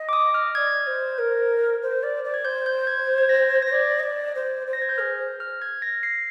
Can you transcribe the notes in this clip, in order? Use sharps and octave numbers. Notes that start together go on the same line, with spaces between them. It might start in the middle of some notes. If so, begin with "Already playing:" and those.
Already playing: D#5
D6
D#6
F6
D5 G#6
C5
A#4
C5
D5
D5
G#6
C5 G6
G6
G#6
G#6
A#6
G#6
C5 A#6
D5 G#6
D#5
D5
C5
C5
A#6
G#6
G6
G#4 F6
F6
G#6
A#6
C7